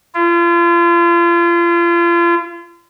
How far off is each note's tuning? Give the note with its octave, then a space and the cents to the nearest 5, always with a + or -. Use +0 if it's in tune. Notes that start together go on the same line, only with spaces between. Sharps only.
F4 -35